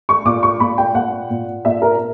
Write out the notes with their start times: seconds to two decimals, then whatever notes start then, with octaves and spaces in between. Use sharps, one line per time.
0.09 C#6
0.25 A#2 D6
0.43 C#6
0.60 A#2 B5
0.78 G5
0.95 A#2 F#5
1.30 A#2
1.65 A#2 E5
1.82 A#4